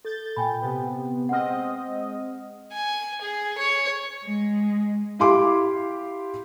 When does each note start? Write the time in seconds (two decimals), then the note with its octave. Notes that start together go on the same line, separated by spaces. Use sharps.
0.05 A4 G6 A6
0.37 A#2 G5 G#5 B5
0.61 C3 B3
1.29 G#3 C4 D#5 F#5 F6
2.72 G#5
3.21 G#4
3.58 C#5
4.24 G#3
5.19 E4 G4 F5 C6 D6